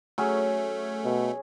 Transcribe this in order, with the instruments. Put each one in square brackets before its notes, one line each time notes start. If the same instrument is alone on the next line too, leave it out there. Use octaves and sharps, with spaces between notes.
[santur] F#3 C#4 G#4 [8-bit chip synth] A3
[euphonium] B2